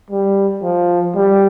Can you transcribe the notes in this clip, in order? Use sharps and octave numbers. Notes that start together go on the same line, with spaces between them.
G3
F3
G3